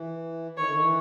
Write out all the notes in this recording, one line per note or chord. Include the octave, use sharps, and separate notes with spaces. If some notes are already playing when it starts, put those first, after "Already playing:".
Already playing: E3
D#3 C#5
D3
D#3
E3